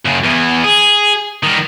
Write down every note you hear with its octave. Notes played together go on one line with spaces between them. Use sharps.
F#2 C#3
E2 E3
G#4
D#3 G3